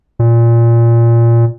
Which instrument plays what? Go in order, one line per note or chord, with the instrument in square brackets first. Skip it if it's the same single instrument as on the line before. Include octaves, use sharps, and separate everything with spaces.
[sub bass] A#2